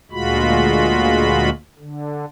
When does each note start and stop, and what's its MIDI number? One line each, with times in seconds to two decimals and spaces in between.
0.11 1.50 38
0.11 1.50 46
0.11 1.50 56
0.11 1.50 65
0.11 1.50 66
0.11 1.50 83
1.78 2.25 50